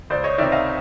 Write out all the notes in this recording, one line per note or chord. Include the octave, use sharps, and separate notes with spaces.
C#2 C5 D5
C#5 D#5
C3 D#3 D5 E5
D#5 F5